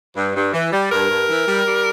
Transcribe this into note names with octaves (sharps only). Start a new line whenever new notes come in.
G2
G2
E3
G3
G2 A#4
G2
E3
G3
G3